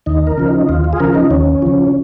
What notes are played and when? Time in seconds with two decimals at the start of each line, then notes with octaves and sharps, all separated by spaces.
0.06 D#2 D#4
0.27 A#4
0.38 C#3 F3
0.48 D#4
0.69 D#2 F4
0.84 F4
0.93 G#4
1.00 C#3 F3 A#4
1.15 D#4
1.31 D#2 C#4
1.62 C#3 F3